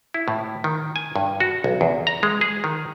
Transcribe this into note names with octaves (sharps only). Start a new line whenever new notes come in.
E4
A2
D#3
G#5
G2
F#4
B1
E2
A#5
G#3
G#4
D#3